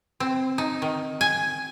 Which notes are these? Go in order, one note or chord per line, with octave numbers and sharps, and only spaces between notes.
C4
D#4
D#3
G#5